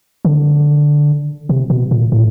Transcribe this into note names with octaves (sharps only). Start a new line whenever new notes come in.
D3
C3
B2
A#2
A2